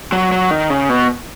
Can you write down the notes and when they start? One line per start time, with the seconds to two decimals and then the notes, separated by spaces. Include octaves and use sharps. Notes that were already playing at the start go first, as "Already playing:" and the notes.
0.12 F#3
0.32 F#3
0.51 D#3
0.70 C#3
0.89 B2